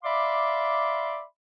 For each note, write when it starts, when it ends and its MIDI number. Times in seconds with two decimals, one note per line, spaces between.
0.03 1.22 74
0.03 1.22 76
0.03 1.22 77
0.03 1.22 83
0.03 1.22 84
0.03 1.22 86